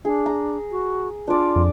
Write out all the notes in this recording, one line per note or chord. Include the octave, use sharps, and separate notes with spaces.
D4 G#4
A#5
F#4
D4 F4 D5
F2